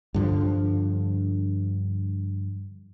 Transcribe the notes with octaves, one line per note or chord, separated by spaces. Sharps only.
G2 D3 F3